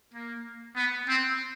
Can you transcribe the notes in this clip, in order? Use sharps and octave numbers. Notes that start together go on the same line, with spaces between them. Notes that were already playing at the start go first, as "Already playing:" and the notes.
A#3
B3
C4